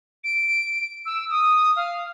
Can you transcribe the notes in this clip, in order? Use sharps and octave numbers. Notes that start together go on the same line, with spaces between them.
D7
E6
D#6
F5